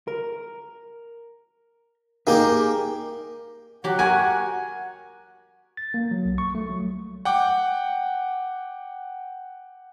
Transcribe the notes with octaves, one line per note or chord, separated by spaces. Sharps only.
A#4
A#3 D#4 G4 G#4 G5
F#3 G4 F#5
F#4 G4 A#4 G#5
A6
A#3
F#3
B1
C#6
A3
F#3
F#5 G5 D6